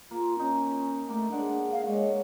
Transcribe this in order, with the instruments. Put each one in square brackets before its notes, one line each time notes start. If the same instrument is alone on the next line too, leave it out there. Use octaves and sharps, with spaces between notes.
[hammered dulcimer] A#3 [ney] F4
[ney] C#4 [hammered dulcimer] D#4
[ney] A3 [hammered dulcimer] A#3 D6
[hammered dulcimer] G#3 D5 F#5 [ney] D4
[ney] F5
[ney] G#3 [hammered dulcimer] C#5